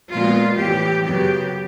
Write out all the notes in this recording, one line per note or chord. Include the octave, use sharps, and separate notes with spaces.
A#2 F3 G#3 B3 F4
A2 E3 G3 G4
F#2 C#3 F#3 B3 G4